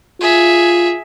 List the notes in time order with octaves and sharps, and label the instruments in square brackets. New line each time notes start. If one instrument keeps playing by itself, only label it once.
[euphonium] F4 [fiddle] G#4 E5